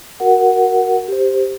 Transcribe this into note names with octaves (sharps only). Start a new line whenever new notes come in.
F#4 A#4 F#5
G4 C5